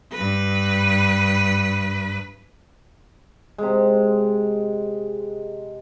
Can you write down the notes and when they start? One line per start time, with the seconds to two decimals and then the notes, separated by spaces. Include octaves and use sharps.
0.13 G2 B4
3.58 C3 G#3